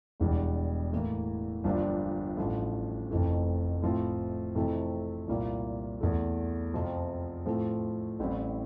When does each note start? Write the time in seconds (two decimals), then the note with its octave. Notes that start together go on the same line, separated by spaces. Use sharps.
0.20 E1 E2 E3 G3 D4
0.93 A2 E3 A#3
1.64 G1 G2 F3 A#3 D4
2.37 A1 G2 F3 A3 E4
3.10 F1 F2 E3 A3
3.82 A2 F3 C4 E4
4.55 F2 C3 E3 A3 E4
5.28 C2 A#2 G3 A#3 E4
6.01 E2 E3 A3
6.74 F2 C3 F3
7.46 A2 F3 A3 C4
8.19 A1 A2 G3 C4 E4